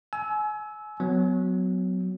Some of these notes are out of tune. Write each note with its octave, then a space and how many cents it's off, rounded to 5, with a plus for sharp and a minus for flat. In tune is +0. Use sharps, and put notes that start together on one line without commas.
G#5 +30 E6 -10
F#3 +0 B3 +30